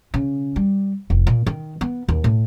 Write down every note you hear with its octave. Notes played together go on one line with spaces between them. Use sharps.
C#3
G3
F1
A#2
D#3
B3
D#2
A2